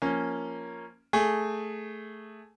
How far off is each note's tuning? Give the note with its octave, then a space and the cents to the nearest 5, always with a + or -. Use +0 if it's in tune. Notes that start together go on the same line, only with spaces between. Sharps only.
F3 +0 A#3 +0 C#4 +0
A3 +0 G#4 +0